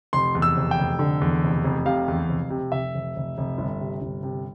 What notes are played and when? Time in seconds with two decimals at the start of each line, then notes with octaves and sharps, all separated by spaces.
0.13 F1 C6
0.35 E2
0.42 E6
0.57 F1
0.71 G5
0.78 F1
0.99 D3
1.21 E2
1.43 F1
1.64 F1
1.85 C3 F5
2.08 E2
2.29 F1
2.50 C3
2.72 F1 E5
2.94 F1
3.16 F1
3.38 F1
3.58 G1
3.80 C3
4.02 G1
4.23 C3